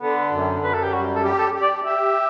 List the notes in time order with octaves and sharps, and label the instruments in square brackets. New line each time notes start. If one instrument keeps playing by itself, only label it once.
[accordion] D3 [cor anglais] B3
[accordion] F#2
[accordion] F#2 [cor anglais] B4
[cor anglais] A4
G4
[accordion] G3 [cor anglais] F#4
[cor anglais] A4
[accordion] G4
[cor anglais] A4
[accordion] G4
[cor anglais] D5
[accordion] G4 [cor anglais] E5